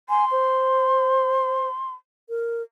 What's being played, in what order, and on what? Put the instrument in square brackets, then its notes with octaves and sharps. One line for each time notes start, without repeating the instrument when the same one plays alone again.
[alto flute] G#5 [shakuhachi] C6
[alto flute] C5
A#4